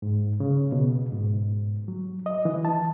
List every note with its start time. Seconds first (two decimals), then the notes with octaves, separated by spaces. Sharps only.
0.02 G#2
0.40 C#3
0.72 B2
1.12 G#2
1.88 F#3
2.26 D#5
2.45 E3
2.65 A5